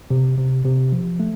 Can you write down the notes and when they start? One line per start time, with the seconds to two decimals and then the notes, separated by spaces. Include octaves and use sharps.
0.10 C3
0.38 C3
0.65 C3
0.92 F3
1.20 A3